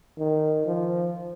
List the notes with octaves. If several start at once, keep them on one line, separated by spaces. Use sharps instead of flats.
D#3
F3